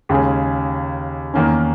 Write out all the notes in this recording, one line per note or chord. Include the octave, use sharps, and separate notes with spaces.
D#2 C#3 G#3 C#4 G#4
E2 D#3 A#3 C#4